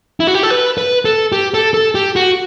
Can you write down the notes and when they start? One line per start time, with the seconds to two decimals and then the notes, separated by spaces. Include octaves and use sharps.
0.20 E4
0.27 F#4
0.35 G4
0.43 A4
0.50 B4
0.78 B4
1.05 A4
1.32 G4
1.54 A4
1.74 A4
1.95 G4
2.16 F#4